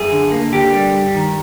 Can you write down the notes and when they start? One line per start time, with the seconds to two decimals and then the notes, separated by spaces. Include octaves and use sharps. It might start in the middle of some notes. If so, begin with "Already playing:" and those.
Already playing: F#2 G#4
0.12 D3
0.32 A#3
0.52 D3 G4
0.73 G3
0.94 G2
1.14 D#3